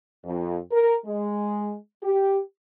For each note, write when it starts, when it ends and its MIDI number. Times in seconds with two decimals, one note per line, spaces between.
0.24 0.58 41
0.72 0.96 70
1.05 1.74 56
2.03 2.39 67